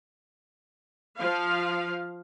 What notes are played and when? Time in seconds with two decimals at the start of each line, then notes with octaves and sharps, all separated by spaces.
1.16 F3 F5